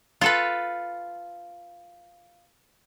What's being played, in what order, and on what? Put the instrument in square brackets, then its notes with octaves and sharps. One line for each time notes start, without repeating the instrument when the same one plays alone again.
[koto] F4 A4 B4